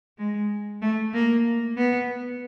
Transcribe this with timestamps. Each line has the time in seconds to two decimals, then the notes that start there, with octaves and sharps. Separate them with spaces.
0.18 G#3
0.82 A3
1.14 A#3
1.76 B3